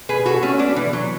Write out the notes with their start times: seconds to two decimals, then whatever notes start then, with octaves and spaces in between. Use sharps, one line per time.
0.09 G#4 B4
0.26 F#4 A4
0.43 A3 C#4
0.59 B3 D4
0.76 E3
0.93 F#3